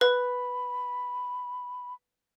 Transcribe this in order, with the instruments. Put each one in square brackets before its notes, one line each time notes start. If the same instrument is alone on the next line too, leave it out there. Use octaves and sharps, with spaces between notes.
[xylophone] B4 [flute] B5